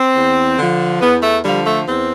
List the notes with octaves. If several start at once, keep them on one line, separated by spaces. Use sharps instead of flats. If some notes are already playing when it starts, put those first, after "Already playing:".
Already playing: C4
E2
D3 F3
E2 B3
A3
D3 F3 G3
A3
E2 C4